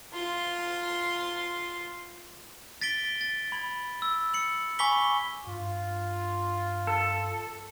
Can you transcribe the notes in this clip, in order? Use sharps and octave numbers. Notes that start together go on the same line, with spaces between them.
F4 C6
A6 B6 D7 G7
A6
B5 G#6 F#7
E6
C#7 F#7
G#5 B5 C#6 D6 B6 G7
G2 F4
A4